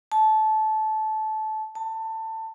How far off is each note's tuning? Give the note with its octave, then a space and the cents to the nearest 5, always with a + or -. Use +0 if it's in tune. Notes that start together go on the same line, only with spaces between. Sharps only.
A5 -20
A5 +20